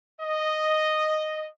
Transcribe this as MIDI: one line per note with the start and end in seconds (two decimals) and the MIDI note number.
0.21 1.47 75